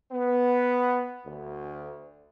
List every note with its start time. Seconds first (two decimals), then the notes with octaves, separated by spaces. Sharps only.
0.11 B3
1.24 D2